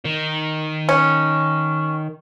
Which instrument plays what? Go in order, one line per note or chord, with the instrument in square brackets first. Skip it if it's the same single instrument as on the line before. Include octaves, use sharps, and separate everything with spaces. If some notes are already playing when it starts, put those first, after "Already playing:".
[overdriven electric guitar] D#3
[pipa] C#4